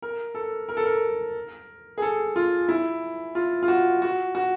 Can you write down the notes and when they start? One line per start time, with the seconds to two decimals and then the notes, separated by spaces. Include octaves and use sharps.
0.02 A#4
0.35 A4
0.69 A#4
0.77 A4
0.86 A#4
1.98 G#4
2.02 A4
2.36 F4
2.69 E4
3.35 F4
3.62 F4
3.68 F#4
4.02 F#4
4.35 F#4